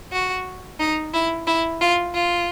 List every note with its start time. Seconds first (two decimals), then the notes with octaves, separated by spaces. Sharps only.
0.12 F#4
0.80 D#4
1.14 E4
1.47 E4
1.81 F4
2.14 F4